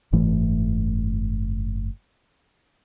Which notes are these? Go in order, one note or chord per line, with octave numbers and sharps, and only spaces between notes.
F#1 G#2 E3 A3